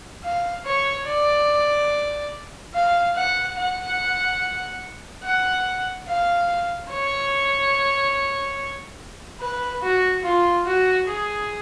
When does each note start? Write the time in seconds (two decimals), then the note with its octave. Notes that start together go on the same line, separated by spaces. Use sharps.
0.24 F5
0.65 C#5
1.07 D5
2.74 F5
3.16 F#5
3.57 F#5
5.24 F#5
6.08 F5
6.91 C#5
9.41 B4
9.83 F#4
10.24 F4
10.66 F#4
11.07 G#4